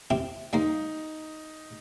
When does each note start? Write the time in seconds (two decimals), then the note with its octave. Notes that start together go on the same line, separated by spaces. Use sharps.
0.10 C4 E4 G4
0.53 G3 A#3 D#4 C5